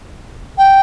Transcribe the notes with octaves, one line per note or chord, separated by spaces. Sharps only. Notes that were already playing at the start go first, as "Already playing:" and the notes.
G5